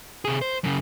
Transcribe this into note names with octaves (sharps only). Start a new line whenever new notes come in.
C3 G#4
C5
F#2 C#3